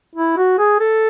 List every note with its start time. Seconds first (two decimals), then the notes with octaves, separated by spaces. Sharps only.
0.16 E4
0.37 F#4
0.59 G#4
0.80 A4